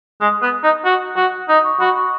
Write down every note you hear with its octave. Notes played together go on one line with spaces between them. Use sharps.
G#3 D#6
B3
D#4
F#4
F#4
D#4 D#6
C#6
F#4 B5
C#6